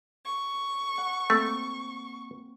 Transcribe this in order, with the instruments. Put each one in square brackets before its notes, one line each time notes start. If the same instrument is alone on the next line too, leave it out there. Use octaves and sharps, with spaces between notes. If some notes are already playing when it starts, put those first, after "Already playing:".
[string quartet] C#6
[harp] F#5
[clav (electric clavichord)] A3 [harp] A#3 C4